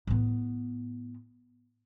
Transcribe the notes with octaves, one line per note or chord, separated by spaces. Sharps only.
A2 B3